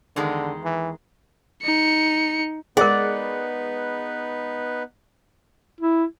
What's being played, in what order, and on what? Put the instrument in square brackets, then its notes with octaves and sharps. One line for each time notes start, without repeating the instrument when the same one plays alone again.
[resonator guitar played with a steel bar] E2 D#3 G#3 [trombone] D3
[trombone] E3
[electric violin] D#4 C#7
[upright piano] G#3 F#5 [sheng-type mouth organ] B3 D#4 B4 [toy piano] G#4 A#4 [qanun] D5
[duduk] E4